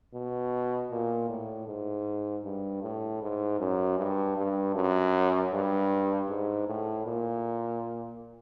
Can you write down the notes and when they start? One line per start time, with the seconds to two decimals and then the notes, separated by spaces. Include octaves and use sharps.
0.14 B2
0.91 A#2
1.29 A2
1.68 G#2
2.44 G2
2.83 A2
3.21 G#2
3.60 F#2
3.98 G2
4.37 G2
4.75 F#2
5.52 G2
6.29 G#2
6.67 A2
7.06 A#2